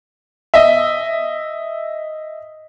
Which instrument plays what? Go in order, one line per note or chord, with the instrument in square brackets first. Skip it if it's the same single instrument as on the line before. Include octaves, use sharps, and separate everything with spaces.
[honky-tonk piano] D#5 E5